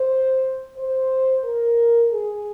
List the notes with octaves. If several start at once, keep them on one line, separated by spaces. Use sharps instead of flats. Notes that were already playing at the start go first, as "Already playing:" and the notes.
Already playing: C5
C5
A#4
G#4